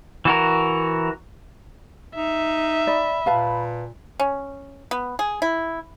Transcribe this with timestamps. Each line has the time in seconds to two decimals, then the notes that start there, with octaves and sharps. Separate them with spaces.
0.25 E3 F#4 A#4
2.16 D#4 E5
2.87 D5 B5
3.26 A#2 B4 F5 A5
4.20 C#4
4.91 B3
5.19 G#4
5.42 E4